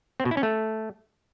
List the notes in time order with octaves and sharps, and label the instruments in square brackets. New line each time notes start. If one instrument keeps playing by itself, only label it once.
[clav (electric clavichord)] C4
B2
E4
C#4
A3